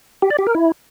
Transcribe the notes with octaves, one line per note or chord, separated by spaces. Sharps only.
G4
D5
G4
A#4
E4